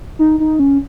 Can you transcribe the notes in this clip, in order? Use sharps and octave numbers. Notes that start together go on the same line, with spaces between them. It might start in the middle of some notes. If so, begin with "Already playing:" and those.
D#4
D#4
C#4